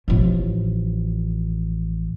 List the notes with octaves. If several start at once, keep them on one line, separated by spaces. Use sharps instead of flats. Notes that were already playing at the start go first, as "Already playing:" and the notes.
A1 F3